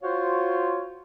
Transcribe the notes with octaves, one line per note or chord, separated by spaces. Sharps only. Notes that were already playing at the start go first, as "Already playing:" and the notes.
F4 F#4 C5 C#5 F5